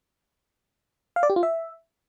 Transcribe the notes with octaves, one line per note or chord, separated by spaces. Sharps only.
F5
D5
G4
F4
E5